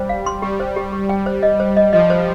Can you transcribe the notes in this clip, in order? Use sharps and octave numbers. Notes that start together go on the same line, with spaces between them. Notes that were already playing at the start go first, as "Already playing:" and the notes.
Already playing: G3 C5
F5
C6
G3 G4
C5
G4
G4
G5
C5
D#5
C5
D#5
F3 D#5
C5